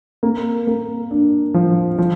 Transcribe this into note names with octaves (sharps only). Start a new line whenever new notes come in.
A#3
A#3
D4
F3
F3